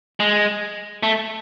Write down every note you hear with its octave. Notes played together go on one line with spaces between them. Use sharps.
G#3
A3